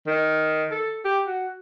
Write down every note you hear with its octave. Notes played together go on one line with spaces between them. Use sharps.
D#3
A4
G4
F#4